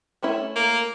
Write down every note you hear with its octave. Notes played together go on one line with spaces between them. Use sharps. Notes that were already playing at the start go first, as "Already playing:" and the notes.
A3 C#4 E4
A#3